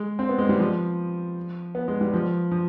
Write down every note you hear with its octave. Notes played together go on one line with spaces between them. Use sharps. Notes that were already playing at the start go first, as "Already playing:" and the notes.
Already playing: G#3
C4
B3
G#3
G3
F3
B3
G#3
G3
F3
F3